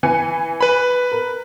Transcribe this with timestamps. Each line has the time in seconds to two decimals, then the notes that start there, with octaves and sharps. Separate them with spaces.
0.03 E3 G#5 C#7
0.61 B4 B5
1.12 A#4